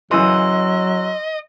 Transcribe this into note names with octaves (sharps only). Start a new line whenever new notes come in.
F#2 C#3 E3 F#3 D#5 C6 E6